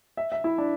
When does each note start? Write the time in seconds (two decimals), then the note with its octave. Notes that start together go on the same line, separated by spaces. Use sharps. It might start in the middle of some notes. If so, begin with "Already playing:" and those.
0.17 E5
0.32 E5
0.44 E4
0.58 D4